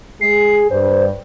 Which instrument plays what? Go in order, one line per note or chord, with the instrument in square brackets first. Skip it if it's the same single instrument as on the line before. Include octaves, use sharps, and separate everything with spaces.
[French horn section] G#3 G#4 [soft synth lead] C7
[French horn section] G2 [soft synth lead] C5